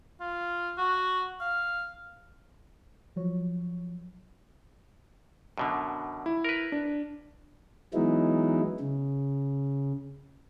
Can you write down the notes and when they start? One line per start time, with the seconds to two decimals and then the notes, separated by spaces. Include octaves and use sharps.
0.21 F4
0.78 F#4
1.41 F5
3.16 F3 F#3 C#5
5.58 F#2 B2 D3
6.26 E4
6.44 A#4 B4
6.72 D4
7.94 E3 F#3 G#3 B3 D#4 E4
8.80 C#3